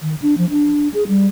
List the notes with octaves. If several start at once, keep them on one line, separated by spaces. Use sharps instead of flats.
D#3
D4
F3
D4
G#4
G3